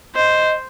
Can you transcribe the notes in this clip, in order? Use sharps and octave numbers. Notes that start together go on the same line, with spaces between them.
C5 D#5